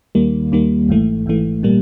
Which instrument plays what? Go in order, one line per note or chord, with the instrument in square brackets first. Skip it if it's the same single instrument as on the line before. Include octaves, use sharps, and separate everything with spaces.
[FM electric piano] D#2 D#3 G3 A#3
D#2 D#3 G3 A#3
G#1 G#2 E3 A3
G#1 G#2 E3 A3
A#2 G3 A#3